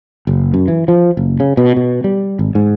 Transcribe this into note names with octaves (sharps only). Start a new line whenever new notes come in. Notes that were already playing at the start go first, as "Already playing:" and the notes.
F#1
F#2
E3
F3
F#1
C#3
B2
B2
G3
G#1
G#2